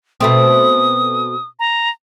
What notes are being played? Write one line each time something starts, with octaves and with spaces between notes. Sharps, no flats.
B2 A3 C4 D#6
A#5